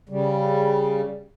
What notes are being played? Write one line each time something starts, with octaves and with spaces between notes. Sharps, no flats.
C#3 G3